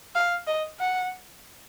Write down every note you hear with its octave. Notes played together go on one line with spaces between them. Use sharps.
F5
D#5
F#5